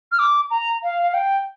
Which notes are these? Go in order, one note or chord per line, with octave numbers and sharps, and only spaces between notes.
F6
D6
A#5
F5
F5
G5